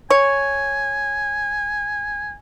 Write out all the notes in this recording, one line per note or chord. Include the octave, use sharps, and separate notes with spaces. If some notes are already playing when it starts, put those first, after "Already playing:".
C#5 G#5